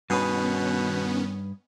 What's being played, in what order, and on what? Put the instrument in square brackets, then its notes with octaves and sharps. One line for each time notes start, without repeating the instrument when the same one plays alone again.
[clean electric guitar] G2 G#4 B4 [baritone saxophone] B2 [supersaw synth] D#3 B3 C#4